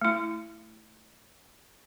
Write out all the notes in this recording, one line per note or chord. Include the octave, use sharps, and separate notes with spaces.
A3 E4